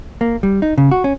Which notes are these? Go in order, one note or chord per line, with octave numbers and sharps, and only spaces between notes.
A#3
G3
D#4
C#3
F#4
C#4